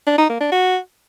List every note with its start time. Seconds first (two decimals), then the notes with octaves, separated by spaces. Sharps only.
0.07 D4
0.18 D#4
0.29 A#3
0.41 D4
0.52 F#4